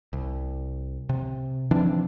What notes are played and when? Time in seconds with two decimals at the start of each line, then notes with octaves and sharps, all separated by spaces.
0.13 C2
1.09 C3
1.71 E3 F3 C4 D4